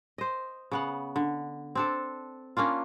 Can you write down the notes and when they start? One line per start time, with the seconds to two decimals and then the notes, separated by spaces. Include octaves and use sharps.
0.18 C5 D#5
0.72 C#3 B3 F#5
1.16 D3
1.75 C4 D4 A4
2.57 A#3 C#4 D4 F4